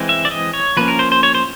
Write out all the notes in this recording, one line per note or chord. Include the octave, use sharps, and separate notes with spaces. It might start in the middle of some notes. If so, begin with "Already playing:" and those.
Already playing: E3 G#3 C4
E5
D5
D#5
C#5
F3 A#3 C#4 B4
A#4
C5
C5
C#5
C5